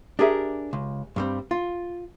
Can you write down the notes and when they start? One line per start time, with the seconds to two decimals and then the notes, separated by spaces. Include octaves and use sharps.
0.19 D4 G4 G#4 A#4 E5
0.73 C#2
1.16 G2 G3 C4
1.51 F4